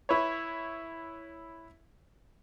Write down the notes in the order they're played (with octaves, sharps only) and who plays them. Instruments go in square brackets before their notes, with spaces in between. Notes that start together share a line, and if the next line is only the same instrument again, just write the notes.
[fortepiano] E4 B4 C#5